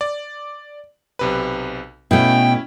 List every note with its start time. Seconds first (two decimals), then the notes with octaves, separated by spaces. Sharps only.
0.01 D5
1.19 B1 C3 B4
2.11 B2 A3 C#4 E4 G5